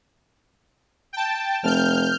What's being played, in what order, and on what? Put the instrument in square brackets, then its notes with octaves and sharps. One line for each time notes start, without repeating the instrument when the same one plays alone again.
[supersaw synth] G5 A5
[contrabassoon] F1 [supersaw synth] F6 G6